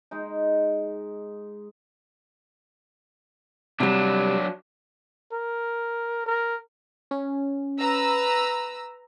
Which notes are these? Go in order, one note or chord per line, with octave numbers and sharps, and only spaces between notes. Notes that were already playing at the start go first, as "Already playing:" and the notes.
G#3 D#4
C3 F#3 G3 D4
A#4
A#4
C#4
B4 A#5 E6